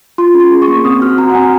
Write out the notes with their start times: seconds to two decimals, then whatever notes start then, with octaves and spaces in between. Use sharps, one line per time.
0.18 F4 C6
0.34 C#4
0.40 C6
0.51 G#4
0.62 C#6
0.68 A#3
0.85 C4 D#6
1.01 F#4 F6
1.18 F#4 A#5
1.30 F#5
1.35 C4 G#5